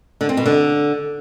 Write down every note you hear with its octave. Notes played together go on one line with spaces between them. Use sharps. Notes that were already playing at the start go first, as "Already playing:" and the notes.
D3
C4
B2
D3